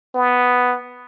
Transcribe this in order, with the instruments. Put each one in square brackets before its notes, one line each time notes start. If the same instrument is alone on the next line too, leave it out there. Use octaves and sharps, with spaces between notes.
[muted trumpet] B3